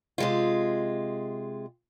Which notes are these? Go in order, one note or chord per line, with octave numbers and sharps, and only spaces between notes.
C3 G#3 F4